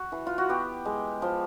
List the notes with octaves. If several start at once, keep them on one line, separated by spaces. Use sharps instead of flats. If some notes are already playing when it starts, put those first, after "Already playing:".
Already playing: F#4
E3
F4
F#4
B3 G4
G#3
F3